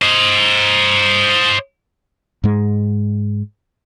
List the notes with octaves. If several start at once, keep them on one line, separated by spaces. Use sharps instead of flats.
C5 D#5
G#2 G#3